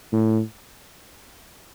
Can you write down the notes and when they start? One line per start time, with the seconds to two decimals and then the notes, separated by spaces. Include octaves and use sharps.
0.13 A2